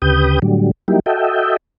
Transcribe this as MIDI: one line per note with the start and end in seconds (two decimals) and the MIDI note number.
0.02 0.39 38
0.02 0.39 49
0.02 0.39 67
0.02 0.39 71
0.02 0.39 87
0.02 0.39 91
0.42 0.71 45
0.42 0.71 50
0.42 0.71 54
0.42 0.71 55
0.88 1.00 54
0.88 1.00 55
0.88 1.00 58
0.88 1.00 63
0.88 1.00 64
0.88 1.00 67
1.06 1.57 66
1.06 1.57 69
1.06 1.57 75
1.06 1.57 76
1.06 1.57 79